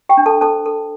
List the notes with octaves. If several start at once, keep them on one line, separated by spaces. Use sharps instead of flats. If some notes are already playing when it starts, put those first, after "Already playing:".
G4 G5
D4
A4 A5
A4 C5 A5
A4